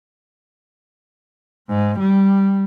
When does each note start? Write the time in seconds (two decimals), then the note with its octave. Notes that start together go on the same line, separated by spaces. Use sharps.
1.69 G#2
1.99 G3